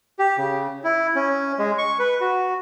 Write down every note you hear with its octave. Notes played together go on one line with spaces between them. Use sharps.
G4
C#3
E4
C#4
G#3
C#6
B4
F#4